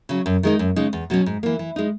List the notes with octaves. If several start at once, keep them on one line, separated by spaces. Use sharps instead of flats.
C#3 F#3
F#2
D#3 G#3 D#4
F#2
C#3 G#3 D#4
E2
B2 F#3 C#4
G#2
E3 A#3
E3
G#3 D#4